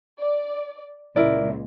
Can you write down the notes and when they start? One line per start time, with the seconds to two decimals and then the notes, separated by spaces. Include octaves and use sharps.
0.19 D5
1.16 C#2 A#2 E4 A#4 D5